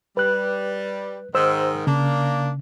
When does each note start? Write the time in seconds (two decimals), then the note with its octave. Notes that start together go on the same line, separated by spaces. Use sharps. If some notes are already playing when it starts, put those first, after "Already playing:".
0.17 G3 B4 F#6
1.35 G#2 D#3 C5 E6
1.87 C#3 A#3 D4